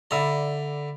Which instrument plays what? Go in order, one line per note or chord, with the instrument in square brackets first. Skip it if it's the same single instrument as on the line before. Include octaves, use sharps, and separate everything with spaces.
[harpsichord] D3 A#5 [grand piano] D5 E5 B5